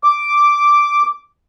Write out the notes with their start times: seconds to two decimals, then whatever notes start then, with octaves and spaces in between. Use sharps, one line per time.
0.04 D6